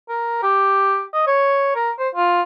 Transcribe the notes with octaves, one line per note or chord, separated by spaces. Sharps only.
A#4
G4
D#5
C#5
A#4
C5
F4